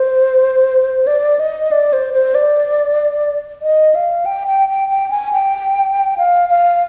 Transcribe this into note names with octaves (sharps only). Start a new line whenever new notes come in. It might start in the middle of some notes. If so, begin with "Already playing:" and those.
Already playing: C5
D5
D#5
D5
C5
C5
D5
D#5
F5
G5
G5
G5
G5
G#5
G5
F5
F5